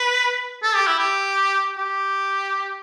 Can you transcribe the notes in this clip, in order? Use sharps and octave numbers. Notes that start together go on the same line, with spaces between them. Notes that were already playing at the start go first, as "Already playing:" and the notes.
Already playing: B4
A4
G4
E4
G4
G4